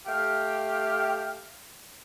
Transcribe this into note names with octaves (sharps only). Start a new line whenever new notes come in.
A3 G4 F5 G5 F6